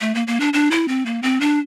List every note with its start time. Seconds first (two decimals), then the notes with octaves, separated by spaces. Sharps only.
0.01 A3
0.15 A#3
0.27 A#3
0.40 D4
0.53 D4
0.71 E4
0.88 C4
1.06 A#3
1.22 C4
1.41 D4